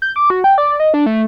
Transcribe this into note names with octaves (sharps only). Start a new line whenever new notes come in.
G6
D6
F#4
G5
D5
D#5
D4
A3